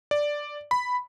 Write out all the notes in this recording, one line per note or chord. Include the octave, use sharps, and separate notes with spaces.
D5
B5